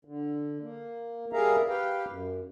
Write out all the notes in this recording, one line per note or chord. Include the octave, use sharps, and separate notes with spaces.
D3
A#3
G3 G#4 A#4 E5 F5 A#5
G4 B4 F5 G5
F#2